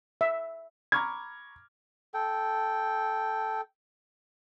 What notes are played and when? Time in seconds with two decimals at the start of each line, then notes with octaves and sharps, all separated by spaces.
0.21 E5
0.92 A#5 B5 C#6 D6 F6 G#6
2.14 A4 G5